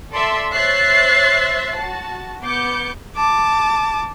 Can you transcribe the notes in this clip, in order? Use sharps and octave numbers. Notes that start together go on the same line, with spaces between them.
A4 D5 E5 C6
C5 C#5 E5 F#6 A6 C7
F#4 A5
B3 D6 G6 C#7
A5 D6